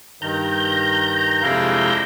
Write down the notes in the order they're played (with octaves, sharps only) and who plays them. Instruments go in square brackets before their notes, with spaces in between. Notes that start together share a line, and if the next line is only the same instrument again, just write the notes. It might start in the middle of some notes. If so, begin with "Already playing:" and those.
[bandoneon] G2 D#3 [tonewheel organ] A#5 G6
[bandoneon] F2 C3 F5 [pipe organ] G#3 D4 E4